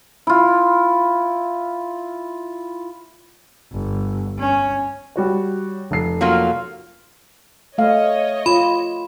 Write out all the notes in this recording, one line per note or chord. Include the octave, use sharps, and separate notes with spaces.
E4 F4
G1
C#4
G3 F#4 C#5
F1 C7
F#3 A#3 F4
A3 C#5 D#5 F5
F4 B5